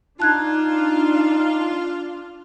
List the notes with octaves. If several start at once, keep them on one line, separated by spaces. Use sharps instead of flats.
D4 D#4 F4 A5 F#6 G#6